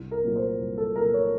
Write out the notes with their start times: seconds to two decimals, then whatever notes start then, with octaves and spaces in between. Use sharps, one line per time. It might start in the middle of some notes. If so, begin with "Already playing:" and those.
Already playing: C2
0.11 A#4
0.24 A#2 F#3 A3
0.36 C5
0.60 C2
0.78 A4
0.95 A#2 F#3 A3 A#4
1.14 C#5